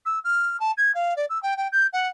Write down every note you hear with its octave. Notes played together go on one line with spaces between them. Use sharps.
E6
F6
A5
G#6
F5
D5
E6
G5
G5
G6
F#5